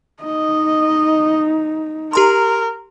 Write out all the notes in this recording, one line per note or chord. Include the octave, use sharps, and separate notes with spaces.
D#4 D#5
G4 A#4 A#5 C6